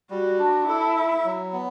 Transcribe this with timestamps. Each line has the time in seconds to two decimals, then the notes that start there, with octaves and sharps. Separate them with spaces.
0.11 G3 F#4
0.39 D4
0.67 E4 A4
0.97 E5
1.24 F#3
1.53 B3